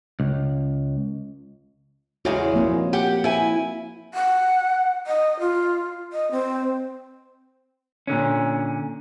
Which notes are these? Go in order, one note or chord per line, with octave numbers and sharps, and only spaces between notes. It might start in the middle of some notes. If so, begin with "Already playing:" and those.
C#2
E2 C#3 G#3 F#4 C#5
F3 A#3 C4
G4 F#5
E4 G#5
F#5
D#5
F4
D#5
C4
A#2 D3 C#4